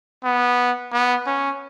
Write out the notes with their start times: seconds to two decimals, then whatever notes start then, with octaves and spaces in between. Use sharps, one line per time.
0.24 B3
0.92 B3
1.26 C#4